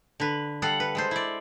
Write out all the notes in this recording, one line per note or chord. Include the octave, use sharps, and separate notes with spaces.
D3 B4
G3 A4 F5 F#5
B4
G#3 A4 C5
E4 D5